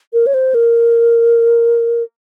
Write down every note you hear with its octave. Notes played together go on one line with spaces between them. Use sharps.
A#4
C#5
C5
A#4